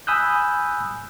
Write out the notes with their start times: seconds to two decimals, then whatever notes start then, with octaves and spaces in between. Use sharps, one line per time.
0.07 G#5 B5 D#6 E6 F#6 G6